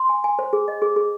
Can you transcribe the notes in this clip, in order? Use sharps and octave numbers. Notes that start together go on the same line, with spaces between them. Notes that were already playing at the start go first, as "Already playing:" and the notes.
Already playing: C6
G#5
G#5
C5
G#4
D#5
G#4
G#4